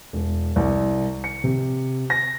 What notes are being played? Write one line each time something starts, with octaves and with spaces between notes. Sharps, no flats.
E1
C2
C#7
C3
A#6